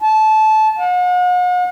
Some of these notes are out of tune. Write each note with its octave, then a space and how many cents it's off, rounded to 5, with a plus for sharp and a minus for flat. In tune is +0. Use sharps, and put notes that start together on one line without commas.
A5 -20
F#5 -45